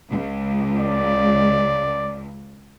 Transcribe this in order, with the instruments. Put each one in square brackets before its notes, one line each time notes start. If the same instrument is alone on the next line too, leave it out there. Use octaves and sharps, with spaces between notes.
[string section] C#2
[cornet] D5